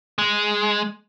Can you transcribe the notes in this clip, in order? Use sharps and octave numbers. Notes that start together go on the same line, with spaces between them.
G#3